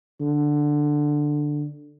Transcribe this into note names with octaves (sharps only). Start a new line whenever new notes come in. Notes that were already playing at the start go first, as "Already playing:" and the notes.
D3